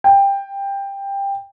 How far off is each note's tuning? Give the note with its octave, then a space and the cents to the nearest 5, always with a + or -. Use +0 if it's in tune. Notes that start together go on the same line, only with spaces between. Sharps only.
G5 +15